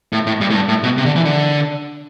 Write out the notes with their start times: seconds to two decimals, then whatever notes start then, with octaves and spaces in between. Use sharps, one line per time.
0.13 A2
0.26 A2
0.41 G2
0.50 A2
0.55 G2
0.68 A2
0.84 B2
0.98 C3
1.06 D3
1.16 E3
1.25 D3